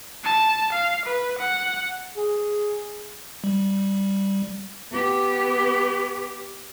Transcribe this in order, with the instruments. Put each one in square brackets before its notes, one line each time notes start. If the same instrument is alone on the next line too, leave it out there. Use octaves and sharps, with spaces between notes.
[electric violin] A5
F5
B4
F#5
[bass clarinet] G#4
[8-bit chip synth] G3
[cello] B3 G4